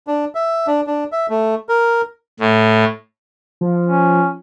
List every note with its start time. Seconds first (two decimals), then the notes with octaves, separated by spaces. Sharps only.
0.07 D4
0.35 E5
0.67 D4
0.87 D4
1.12 E5
1.30 A3
1.69 A#4
2.40 A2
3.61 F3
3.87 C#4